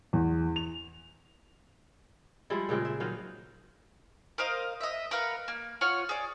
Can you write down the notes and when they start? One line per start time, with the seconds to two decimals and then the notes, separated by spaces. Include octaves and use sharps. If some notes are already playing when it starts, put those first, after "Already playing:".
0.13 E2
0.56 F7
2.50 F3 G3 G#3 E4
2.69 A#2 C#3 G#3 C4
2.85 E5
3.00 D#3 F#3 D#4 F5
4.38 A#4 C5 D#5 F5
4.81 D#5 E5
5.11 A#4 B4 F5 F#5
5.48 A#3
5.81 F4 C#5 F#5 F6
6.09 G#4 D5